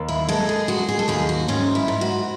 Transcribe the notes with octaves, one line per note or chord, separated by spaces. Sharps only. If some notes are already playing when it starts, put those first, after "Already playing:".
Already playing: D#2
E4
G#3 A4
G#4
G#3 F#4
G#4
A4
D#2 G#4
F#4
G#2 C#4
E4
G#2
F#4